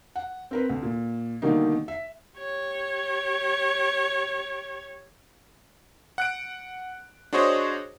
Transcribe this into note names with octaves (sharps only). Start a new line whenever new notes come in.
F#5
C4 A#4 B4
D2
A#2
B2 D3 D#3 G3 A#3 D#4
E5
G4 C#5
F#5 F#6 D7
D4 F#4 G#4 C5 C#5 D#5